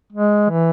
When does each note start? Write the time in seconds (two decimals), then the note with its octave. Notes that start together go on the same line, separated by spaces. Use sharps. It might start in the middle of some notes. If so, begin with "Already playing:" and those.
0.13 G#3
0.50 E3